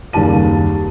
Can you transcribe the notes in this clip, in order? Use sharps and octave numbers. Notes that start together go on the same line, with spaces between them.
F#1 D#2 G3 A5 D#7